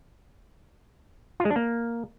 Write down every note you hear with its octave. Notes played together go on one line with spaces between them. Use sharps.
F4
G#3
D4
A#3